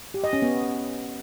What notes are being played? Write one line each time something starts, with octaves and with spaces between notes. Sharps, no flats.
G4
D#5
C#4
B3